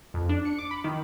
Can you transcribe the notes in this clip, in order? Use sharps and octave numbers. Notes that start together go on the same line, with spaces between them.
F2
D4
C#7
D6
B5
D#3